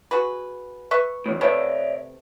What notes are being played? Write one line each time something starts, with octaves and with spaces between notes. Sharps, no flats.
F#4 G#4 B4
B4 E5 C#6
E2 A2
C3 A3 B3 C#5 D5 E5